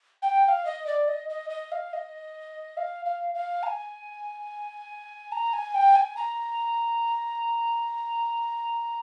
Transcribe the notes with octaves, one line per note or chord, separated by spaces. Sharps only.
G5
G5
F5
D#5
D5
D#5
D#5
D#5
F5
D#5
F5
F5
F5
A#5
G#5
A#5
G#5
G5
G#5
A#5